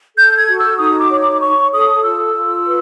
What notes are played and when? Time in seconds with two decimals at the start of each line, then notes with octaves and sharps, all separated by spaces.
0.17 A4 G6
0.37 G#6
0.48 F#4
0.58 E6
0.78 D#4 D#6
1.00 D6
1.10 C#5
1.21 D6
1.41 C#5 C#6
1.73 A4 D#6
2.03 F4 E6
2.35 F4
2.66 B4